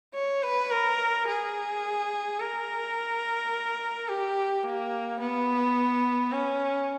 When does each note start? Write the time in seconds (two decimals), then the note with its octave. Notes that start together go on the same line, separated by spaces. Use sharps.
0.14 C#5
0.43 B4
0.71 A#4
1.27 G#4
2.39 A#4
4.08 G4
4.64 A#3
5.20 B3
6.33 C#4